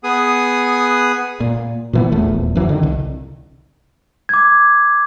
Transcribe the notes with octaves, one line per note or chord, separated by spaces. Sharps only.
B3 G#4 D#6
A#2
A#2 E3 B3
D#1 A#1 E2 A3
F#2 E3 F#3
D3 D#3
C2
D6 G#6